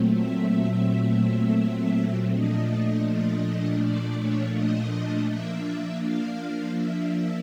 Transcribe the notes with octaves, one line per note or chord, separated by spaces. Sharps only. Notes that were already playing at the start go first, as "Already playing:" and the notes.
Already playing: A#2 F#3 A3 C4
E5
A#2 F3 A3 D4 D#5
D#5
D5
C#5
D#5
F3 A#3 D4 E5
F5
E5